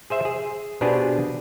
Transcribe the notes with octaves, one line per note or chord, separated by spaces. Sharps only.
G#4 C5 E5
G#4
B2 B3 C4 D4 G4 G#4